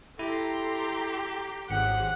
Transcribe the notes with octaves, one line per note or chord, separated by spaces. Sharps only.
E4 G4 A4 A#5 C6
G#1 F#3 G#4 C5 F#5 C#7